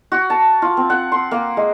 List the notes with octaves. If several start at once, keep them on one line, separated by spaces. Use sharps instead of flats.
F#4
A5
F4
C4
F#5
C6
A#3
G#3